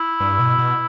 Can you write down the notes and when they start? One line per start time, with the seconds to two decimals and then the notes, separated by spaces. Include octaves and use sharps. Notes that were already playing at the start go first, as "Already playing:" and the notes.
Already playing: E4
0.20 G2
0.39 B2
0.58 B2